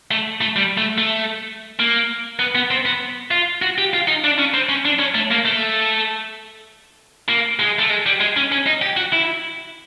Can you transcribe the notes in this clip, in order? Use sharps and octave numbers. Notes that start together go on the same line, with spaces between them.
A3
A3
G3
A3
A3
A#3
B3
B3
C4
B3
F4
F#4
G4
F4
D#4
D4
C#4
C4
C#4
D4
C#4
A3
A#3
A3
A#3
G#3
A3
G#3
G3
G#3
C#4
C#4
D#4
G4
F#4
E4